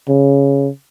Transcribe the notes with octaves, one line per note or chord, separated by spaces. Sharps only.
C#3